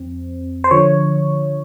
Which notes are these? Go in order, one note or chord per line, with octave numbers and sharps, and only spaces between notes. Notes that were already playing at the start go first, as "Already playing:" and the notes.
Already playing: F2 C4
C5
D3 F3 C#5